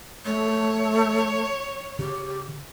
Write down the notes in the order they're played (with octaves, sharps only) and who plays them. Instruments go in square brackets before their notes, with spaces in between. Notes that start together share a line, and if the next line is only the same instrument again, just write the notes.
[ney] A3 [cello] C#5
[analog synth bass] C#3 [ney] G4